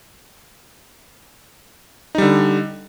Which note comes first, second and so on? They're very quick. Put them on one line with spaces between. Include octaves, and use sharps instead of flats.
D#4 G3 D3